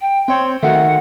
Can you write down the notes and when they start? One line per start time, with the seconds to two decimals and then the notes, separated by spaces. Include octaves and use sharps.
0.01 G5
0.28 C4 C#5 G5 C6
0.63 D#3 A3 F#4 F#5